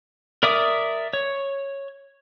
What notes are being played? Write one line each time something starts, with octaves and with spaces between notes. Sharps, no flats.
A#4 D5 E5 D6 D#6
C#5